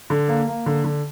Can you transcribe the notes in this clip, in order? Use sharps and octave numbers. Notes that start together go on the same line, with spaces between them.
D3
A#3
A#3
D3
D3